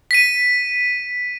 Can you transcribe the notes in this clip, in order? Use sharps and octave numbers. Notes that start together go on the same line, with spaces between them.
B6 D#7